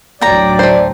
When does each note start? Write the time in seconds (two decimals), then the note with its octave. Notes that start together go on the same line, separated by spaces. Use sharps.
0.21 A1 D2 F#3 D5 G5 A#5
0.59 A3 C5